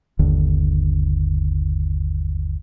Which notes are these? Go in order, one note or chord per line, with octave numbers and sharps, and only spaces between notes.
G1 D#2 D3